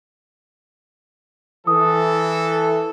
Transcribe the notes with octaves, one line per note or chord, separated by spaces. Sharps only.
E3 A4 D#6